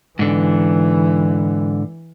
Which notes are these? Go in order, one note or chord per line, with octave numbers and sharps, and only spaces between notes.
G#2 D3 E3